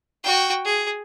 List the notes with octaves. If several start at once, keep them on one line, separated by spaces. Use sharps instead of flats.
F#4 G5
G#4